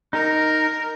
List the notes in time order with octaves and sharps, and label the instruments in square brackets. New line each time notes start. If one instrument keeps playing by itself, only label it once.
[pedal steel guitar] D#4 [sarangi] A#4